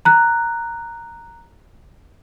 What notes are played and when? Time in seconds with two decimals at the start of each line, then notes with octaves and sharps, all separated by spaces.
0.05 A#5 F#6